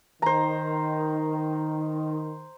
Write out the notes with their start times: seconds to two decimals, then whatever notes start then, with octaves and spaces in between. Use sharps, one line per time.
0.22 D#3 C5 A#5